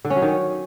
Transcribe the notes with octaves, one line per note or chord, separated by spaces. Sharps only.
D3
C#4
F#3
D#3
C#4